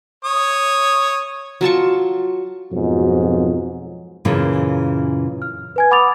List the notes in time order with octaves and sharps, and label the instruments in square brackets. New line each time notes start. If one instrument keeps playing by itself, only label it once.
[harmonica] C#5 D#6
[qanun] F#3 F4 A5 C#6
[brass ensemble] F2 G#2 B2 F3 F#3
[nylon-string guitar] F#2 A#2 C#3 E3
[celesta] F6
B4 G#5 G#6
F#5 B5 D6 D#6 A6 F7